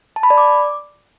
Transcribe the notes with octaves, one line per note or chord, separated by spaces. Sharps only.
A5
B5
D5
D6